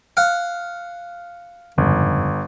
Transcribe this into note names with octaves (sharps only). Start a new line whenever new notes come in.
F5 F#5
G1 F2 G#2 C#3